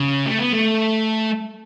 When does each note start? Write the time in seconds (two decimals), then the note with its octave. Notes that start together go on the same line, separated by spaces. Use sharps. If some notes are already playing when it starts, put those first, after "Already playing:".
Already playing: C#3
0.26 A3
0.39 B3
0.53 A3